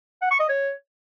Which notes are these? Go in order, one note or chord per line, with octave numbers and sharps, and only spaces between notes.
F#5
C#6
D#5
C#5